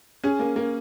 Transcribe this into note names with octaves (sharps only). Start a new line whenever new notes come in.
C#4 G#4
A#3
A#3